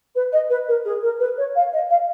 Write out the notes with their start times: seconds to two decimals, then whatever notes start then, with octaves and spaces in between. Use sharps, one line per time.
0.15 B4
0.32 D#5
0.49 B4
0.68 A#4
0.84 G#4
1.02 A#4
1.19 B4
1.37 C#5
1.55 F5
1.72 D#5
1.89 F5